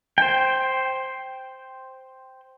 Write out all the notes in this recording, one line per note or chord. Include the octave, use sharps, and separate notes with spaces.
C5 G5